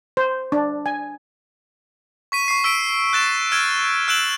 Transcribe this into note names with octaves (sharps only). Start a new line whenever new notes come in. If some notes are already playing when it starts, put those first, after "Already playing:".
C5
D4
G#5
C#6 B6 D#7
C#6 C7
E6 B6 D7
F#6 A6 E7
E6 F6 G#6 D7 E7
E6 F#6 D7 E7 F#7